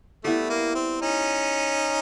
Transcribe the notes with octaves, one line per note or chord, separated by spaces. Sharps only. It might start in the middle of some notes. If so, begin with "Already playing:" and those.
G3 A3 B3 E4
A#3
C4
C#4 D#4